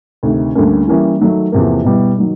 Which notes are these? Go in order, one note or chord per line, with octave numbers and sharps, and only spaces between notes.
D2 C3 D#3
D2 D3 G3 A#3 C#4
E3 G3 A#3 C#4 E4
D#3 F#3 A3
E2 C3 F3 A#3
B2 G3 B3 E4
D#3 F#3